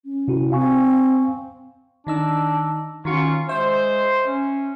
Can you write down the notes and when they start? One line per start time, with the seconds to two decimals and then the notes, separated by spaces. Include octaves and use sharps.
0.05 C#4
0.28 C3 E4 F#4
0.52 C4 F5 G#5 C#6
2.07 D#3 D4 D#4 E6
3.05 D#3 C#4 F4 F#4 C#6
3.49 G#3 C5 E5
4.26 C#4